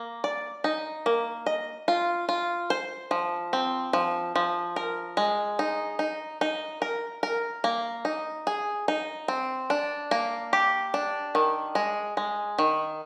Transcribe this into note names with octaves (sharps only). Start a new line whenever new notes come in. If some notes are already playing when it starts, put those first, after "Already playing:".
Already playing: A#3
D5
D#4
A#3
D#5
F4
F4
C5
F3
C4
F3
F3
A#4
G#3
D#4
D#4
D#4
A#4
A#4
A#3
D#4
G#4
D#4
C4
D4
A#3
G4
D4
D#3
G#3
G#3
D#3